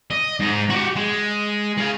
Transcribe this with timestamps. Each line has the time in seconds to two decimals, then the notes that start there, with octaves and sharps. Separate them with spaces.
0.11 D#5
0.40 G#2 D#4
0.70 F#4 G4
0.96 G#3
1.77 G#4 F5